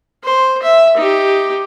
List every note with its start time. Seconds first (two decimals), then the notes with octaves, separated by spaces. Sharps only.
0.24 C5
0.62 E5
0.97 D#4 G4